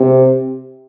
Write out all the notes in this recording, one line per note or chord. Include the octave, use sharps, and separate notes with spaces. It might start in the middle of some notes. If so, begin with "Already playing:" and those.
Already playing: C3